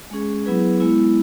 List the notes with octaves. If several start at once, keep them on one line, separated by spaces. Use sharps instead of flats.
G#3 C#4 G#4
F#3 B3 E4 G#4 B4
G#3 B3 E4